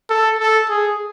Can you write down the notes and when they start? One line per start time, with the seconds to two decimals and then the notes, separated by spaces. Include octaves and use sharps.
0.09 A4
0.39 A4
0.69 G#4